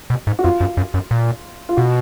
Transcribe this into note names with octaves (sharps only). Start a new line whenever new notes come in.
B2
G#2
F#4
F2 F4
F#2
F#2
F#2
A#2
F4
B2 F#4